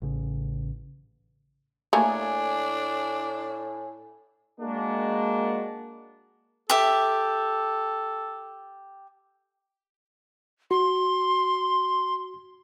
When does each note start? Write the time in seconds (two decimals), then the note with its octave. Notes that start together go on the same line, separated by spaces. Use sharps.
0.02 A1 C#3
1.93 A2 A3 A#3 D4 G#5
4.61 G#3 A#3 D4 F#4
6.70 G4 A4 E5
10.71 F#4 C6